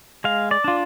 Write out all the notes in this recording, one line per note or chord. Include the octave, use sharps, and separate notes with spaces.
G#3 F5
D5
D4 F4